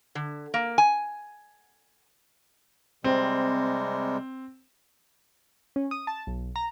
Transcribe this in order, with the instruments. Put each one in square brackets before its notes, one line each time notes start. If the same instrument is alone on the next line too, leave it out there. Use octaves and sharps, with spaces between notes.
[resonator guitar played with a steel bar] D3
A#3
G#5
[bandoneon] C3 G3 G#3 [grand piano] C4
[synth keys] C#4
D#6
A5
B1
A#5